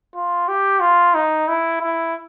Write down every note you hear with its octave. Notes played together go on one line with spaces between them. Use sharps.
F4
G4
F4
D#4
E4
E4